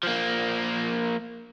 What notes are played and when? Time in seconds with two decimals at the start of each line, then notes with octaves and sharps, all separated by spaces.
0.03 F3 A#3